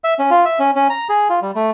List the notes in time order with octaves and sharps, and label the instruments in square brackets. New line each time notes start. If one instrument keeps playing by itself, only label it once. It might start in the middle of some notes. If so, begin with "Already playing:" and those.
[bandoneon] E5
C#4
F4
E5
C#4
C#4
A#5
G#4
F4
G3
A3